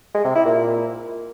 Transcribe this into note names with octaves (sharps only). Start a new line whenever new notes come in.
G#3
C3
E4
A#2